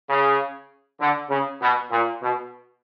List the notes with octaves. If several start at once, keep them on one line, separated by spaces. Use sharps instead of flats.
C#3
D3
C#3
B2
A#2
B2